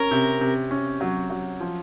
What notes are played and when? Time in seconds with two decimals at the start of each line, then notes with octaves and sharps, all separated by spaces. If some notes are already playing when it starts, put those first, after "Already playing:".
Already playing: C#4 A#4
0.11 C3
0.41 C3
0.71 C#4
1.01 F#3
1.30 F#3
1.60 F3